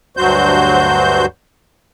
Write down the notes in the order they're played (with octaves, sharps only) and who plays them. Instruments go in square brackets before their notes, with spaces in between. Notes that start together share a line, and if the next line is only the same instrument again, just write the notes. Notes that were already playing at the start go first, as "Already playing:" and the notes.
[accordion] D2 G2 F#3 F#4 C5 G6